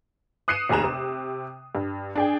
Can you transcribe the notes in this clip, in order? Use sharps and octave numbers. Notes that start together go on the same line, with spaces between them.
D#6 F#6 C7 C#7 D#7 E7
F1 D#2 G#4 A#5 E7
C3
G2
D4 G#4 G5